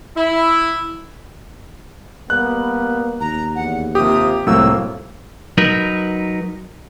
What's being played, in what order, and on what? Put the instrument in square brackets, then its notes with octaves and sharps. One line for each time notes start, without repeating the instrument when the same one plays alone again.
[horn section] E4
[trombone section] G3 A#3 B3 [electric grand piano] F#6
[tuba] D#2 [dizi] A#5
[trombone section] E2 [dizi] F#5
[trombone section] C3 F3 A#3 [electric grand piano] G4 [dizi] D#6
[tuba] C2 [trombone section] F2 A#3 [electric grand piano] A2 F#3 [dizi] E6
[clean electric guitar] F#3 D#4 A#4 B4